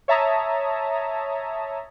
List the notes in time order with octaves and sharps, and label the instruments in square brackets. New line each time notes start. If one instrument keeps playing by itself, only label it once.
[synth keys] C#5 E5 A5 A#5 D#6